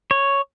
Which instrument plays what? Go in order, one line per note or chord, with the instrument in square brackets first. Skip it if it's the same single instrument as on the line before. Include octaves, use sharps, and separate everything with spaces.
[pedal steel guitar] C#5